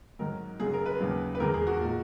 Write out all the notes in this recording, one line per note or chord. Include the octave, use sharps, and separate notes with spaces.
G#2 D#3 F#3 A#4
F#2 C#3 F#3 G#4
A#4
B4
D#2 C#3 F#3
B4
E2 D#3 G#3 A#4
G#4
F#4
A#2 G#3